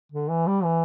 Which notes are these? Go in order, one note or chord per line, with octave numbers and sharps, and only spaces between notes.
D3
E3
G3
E3